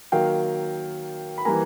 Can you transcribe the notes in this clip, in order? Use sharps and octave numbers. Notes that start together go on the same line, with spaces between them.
D#3 F#3 A#3 F5 G5
B5
E3 G3 A#3 G#5 A#5